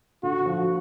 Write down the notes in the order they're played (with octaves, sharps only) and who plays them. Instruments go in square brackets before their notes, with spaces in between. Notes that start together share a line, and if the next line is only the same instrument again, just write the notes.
[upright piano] D3 [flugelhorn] F#4
[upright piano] F3